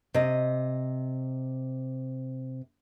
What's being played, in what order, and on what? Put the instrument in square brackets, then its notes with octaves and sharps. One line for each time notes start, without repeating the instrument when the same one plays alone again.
[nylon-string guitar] C3 D#5